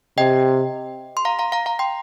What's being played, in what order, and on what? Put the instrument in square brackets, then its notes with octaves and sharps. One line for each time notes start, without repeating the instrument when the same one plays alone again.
[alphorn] C3 [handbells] D#5 G5
[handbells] C6
F5 A#5
F5 A#5
F5 A#5
F5 A#5
G5 C6